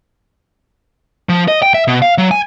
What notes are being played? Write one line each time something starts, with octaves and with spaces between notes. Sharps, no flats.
F3
D#5
G5
E5
B2
F5
F#3
G#5